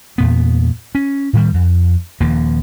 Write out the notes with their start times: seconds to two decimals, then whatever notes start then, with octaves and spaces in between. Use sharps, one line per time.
0.18 E2 A#2 B3
0.95 C#4
1.33 A2 D#3 G3
1.54 F2
2.20 D#1 D#2 F3 A#3